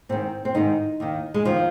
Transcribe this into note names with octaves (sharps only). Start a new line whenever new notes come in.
G#2 D#3 C4
C4
G#2 D#3 D#4
D#2 D#3
G#3
D#2 D#3 F3